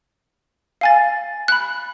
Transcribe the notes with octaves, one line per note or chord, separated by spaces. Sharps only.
F5 G#5 A6
B5 F#6